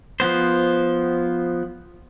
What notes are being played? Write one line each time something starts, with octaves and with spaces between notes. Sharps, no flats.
F3 B3 C5